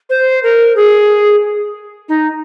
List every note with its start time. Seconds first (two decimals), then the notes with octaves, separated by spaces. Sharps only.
0.10 C5
0.43 A#4
0.76 G#4
2.09 D#4